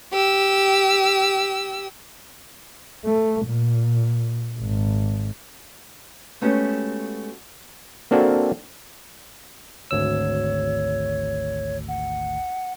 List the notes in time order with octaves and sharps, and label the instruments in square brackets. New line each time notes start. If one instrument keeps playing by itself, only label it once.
[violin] G4 E6
[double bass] A3
A#2
G#1
[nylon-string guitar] G#3 A3 B3 C#4 F#4 G4
[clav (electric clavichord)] A#3 C4 D4 F#4 A4 A#4
[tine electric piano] G#1 D2 E6 [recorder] C#5
[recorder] F#5